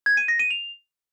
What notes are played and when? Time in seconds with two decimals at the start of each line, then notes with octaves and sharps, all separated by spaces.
0.06 G#6
0.17 D#7
0.28 A#6
0.39 D#7
0.51 F7